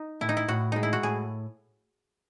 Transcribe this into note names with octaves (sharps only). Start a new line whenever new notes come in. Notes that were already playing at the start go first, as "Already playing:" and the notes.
Already playing: D#4
A2 E4
D#4
E4
A2 F#4
G#3 D#4
E4
F#4
A2 G#4